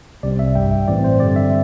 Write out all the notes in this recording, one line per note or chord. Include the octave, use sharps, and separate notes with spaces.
C2 C3 G3 C4 D5
E5
A1 G2 G3 G5
E5
A2 E3 C4 D5
C5
G2 D3 G3 C4 D5
E5